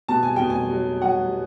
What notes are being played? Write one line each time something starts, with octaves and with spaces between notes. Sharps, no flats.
B2 A5
G#5
B2 G5
G#5
F#3
F#3 F#5